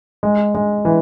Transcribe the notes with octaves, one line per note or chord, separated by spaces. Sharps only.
G#3
G#3
E3